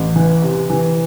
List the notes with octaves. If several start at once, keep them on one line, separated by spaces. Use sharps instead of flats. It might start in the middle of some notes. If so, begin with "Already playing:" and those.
Already playing: A1
E3
C3
E3